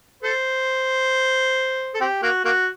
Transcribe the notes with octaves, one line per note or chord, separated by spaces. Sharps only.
A4 C5
A4
C4 G4
A#3 F#4
A#3 F#4